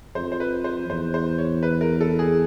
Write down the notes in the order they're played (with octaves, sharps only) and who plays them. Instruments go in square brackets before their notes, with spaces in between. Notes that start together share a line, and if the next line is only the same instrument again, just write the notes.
[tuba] F2 [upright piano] C5
[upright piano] C5
B4
C5
[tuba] E2 [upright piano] C5
[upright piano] C5
C#5
B4
A#4
A4
G#4